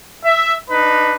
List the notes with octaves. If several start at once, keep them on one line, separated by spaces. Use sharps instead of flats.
E5
D4 D#4 B4